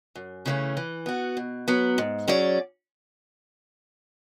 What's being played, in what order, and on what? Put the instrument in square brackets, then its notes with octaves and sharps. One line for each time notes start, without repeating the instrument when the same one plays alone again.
[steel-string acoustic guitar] F#2
C#3 E3 A3 C#4
E3
B3 F#4
B2
F#3 B3
G#2
F#3 C#4 G#4 D5